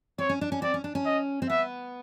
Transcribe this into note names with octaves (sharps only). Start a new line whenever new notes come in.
C4 C#5
C#4
D4
C#4
C4 D5
C#4
D4
C#4
D#5
C4
B3 E5